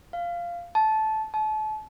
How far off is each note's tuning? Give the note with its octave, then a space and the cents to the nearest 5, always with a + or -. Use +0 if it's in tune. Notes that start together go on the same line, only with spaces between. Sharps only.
F5 -10
A5 -15
A5 -35